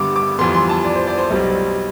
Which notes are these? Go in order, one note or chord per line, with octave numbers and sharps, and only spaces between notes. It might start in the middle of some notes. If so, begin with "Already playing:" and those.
Already playing: G2 D3 G3 B3 C6 D6
D6
F2 E3 G3 B3 C6
C6
A5
D5
C5
D5
C5
B1 B2 G3 C4